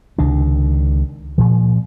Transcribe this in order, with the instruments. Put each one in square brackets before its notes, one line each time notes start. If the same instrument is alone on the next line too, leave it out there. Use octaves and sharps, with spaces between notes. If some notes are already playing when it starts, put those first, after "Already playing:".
[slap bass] C#2 C3 D#3 D4
A#2 F3